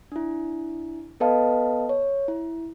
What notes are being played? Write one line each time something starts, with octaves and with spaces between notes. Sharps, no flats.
D4 E4
B3 A4 B4 D#5 F5 A5
C#5
E4